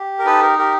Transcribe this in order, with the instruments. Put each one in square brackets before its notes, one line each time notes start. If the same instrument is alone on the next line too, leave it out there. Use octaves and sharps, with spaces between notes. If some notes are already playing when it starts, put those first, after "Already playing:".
Already playing: [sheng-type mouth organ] G4
A#4
D#4 A4 B4
A#4
G4 A#4